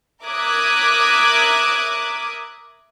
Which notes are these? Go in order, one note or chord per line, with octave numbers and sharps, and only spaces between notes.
A#4 E5 D6 D#6 F#6 G#6